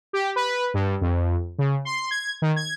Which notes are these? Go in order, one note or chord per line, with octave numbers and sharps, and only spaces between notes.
G4
B4
G2
F2
C#3
C6
G#6
D#3
G#6